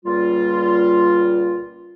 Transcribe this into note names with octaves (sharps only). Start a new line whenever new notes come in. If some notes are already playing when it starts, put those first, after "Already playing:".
C#2 A#2 G3 A#3 F4